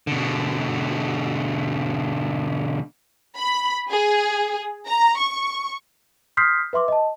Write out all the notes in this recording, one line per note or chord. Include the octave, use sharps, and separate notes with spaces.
B2 D3
B5
G#4
A#5
C#6
C6 D#6 F6 G6 B6 C7
B4 E5 C6 D6
D#5 A5